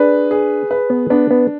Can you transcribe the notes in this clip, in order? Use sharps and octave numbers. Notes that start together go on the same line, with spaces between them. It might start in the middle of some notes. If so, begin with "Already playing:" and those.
Already playing: D4 G#4 B4
G#4
B4
B3
B3 D4
B3